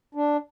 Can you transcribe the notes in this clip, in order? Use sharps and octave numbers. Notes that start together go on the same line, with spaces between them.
D4